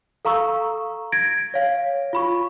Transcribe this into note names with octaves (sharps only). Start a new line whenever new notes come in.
A4 F5 A#5 C#6 E6
G#6 A#6 D7
C#5 F5
F4 B5 C#6